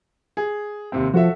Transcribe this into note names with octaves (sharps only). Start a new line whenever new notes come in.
G#4
D#2 C3 C4
F3 F#4 A4 E5